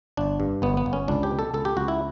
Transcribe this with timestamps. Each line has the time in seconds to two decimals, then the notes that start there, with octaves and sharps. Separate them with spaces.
0.17 G1 D4
0.40 G2
0.62 G1 B3
0.77 B3
0.86 G1
0.93 C#4
1.08 C#2 D4
1.23 G4
1.31 B2
1.39 A4
1.54 C#2 A4
1.65 G4
1.77 C#2 F#4
1.88 E4